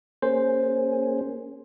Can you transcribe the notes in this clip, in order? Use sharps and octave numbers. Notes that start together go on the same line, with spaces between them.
A#3 C#4 G#4 C5